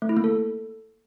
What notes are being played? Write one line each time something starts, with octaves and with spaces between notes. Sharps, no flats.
A3
E4
A#3
A4